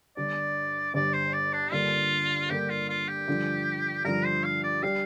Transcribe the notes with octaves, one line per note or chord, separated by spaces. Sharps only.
G1 G2 G3 D4 D5
G1 G2 G3 D4 D5
C5
D5
D4
G2 D3 A#3 F4
G2 D3 A#3 G4
F4
F4
G4
G2 D3 F3
G2 D3 F3 A#4
C5
F5
D5
G3 D4 G4 F5